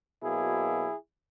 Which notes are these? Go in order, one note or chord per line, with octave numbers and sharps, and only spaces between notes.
B2 F#3 A#3 E4 G#4